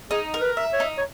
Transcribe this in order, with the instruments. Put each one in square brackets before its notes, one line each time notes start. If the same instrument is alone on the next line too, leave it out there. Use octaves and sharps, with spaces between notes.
[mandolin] D#4 [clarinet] G#4
[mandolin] A#4
[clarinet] B4
[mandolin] E5
[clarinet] C#5
[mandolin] D#4
[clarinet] C#5